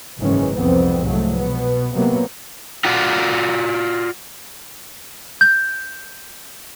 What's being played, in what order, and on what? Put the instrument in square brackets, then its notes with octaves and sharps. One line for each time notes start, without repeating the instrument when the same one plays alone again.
[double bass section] F#1 G#2 D#3 E3 G#3 C#4
C2 F2 G#2 B3 C4
C2 G#2 F3 F#3 G#3 A3
B2 B3
C3 F#3 A#3 B3
[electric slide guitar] F4 F#4 D5
[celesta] G6